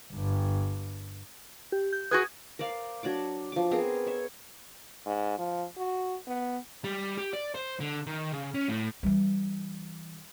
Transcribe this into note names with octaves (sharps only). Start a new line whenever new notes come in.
G1 G2
G4
G6
F#4 G#4 B4 D#6 G#6
A#4 C5 D5 F5
F#3 D4 D5 D6
F3 D6
B3 C4 G#4 A#4
C#5 E5
G#2
F3
F#4
B3
G3
G4
D5
C5
D3
D#3
C#3
C#4
A2
E3 G3